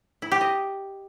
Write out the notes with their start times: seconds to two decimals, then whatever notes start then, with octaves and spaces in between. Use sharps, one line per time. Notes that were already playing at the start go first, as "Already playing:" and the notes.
0.22 E4
0.32 G4
0.41 D#5